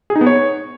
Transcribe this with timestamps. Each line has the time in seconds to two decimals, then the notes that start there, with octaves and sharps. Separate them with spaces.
0.10 G#4
0.16 D#4
0.21 B3
0.27 C#5